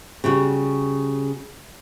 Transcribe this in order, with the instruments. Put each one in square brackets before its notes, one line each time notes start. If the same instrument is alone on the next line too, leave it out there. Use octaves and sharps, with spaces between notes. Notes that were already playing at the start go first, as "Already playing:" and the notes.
[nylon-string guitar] C#3 G3 F#4